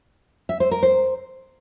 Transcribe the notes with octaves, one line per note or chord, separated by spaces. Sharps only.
E5
C5
A#4
C5